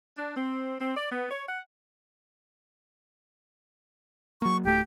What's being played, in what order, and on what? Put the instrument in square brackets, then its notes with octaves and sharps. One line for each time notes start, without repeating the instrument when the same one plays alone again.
[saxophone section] D4
C4
C4
D5
B3
C#5
F#5
[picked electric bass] F#3 A#3 [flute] C#6
[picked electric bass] D1 A3 [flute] G4